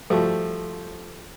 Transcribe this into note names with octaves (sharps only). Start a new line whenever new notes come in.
F3 G3 A3 F#4